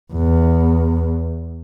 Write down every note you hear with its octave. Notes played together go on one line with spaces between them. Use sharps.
E2